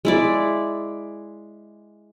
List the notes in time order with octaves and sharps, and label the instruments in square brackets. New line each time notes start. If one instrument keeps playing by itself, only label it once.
[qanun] G#3 E4 D5